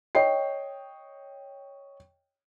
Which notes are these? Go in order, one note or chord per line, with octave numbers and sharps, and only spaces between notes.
C#5 D#5 G5 C7